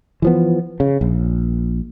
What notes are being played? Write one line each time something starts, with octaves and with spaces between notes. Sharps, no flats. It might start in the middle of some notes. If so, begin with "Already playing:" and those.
E3 F3 B3
C#3
A#1